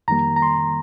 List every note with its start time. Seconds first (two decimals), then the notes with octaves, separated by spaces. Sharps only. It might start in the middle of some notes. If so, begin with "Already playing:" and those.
0.08 F2 D#3 G3 A#3 A#5
0.36 A#5
0.42 C6